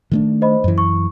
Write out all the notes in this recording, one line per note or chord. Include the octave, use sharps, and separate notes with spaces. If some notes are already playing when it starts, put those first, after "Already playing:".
D#3 A3 D4
C5 D#5 B5
F#2 E3
C#6